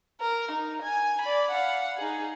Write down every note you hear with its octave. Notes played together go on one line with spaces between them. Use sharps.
A#4
D#4
G#5
D5 B5
F5 F#5
D#4 G#4